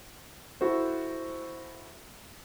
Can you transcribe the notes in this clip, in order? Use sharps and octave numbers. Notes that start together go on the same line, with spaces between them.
E4 F#4 A4 C5